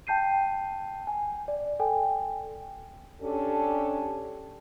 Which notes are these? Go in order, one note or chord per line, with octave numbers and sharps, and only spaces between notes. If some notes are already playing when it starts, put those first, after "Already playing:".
G5 A5 G6 C7 D#7
G#5
D5
A4 G5 G#5
C#4 D4 G4 A4